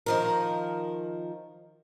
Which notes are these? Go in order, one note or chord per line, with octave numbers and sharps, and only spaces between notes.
D#3 F3 A#4